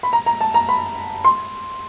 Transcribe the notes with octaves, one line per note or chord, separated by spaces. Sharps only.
B5
A#5
A#5
A5
A#5
B5
C6